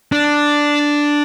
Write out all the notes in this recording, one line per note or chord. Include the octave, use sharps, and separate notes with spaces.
D4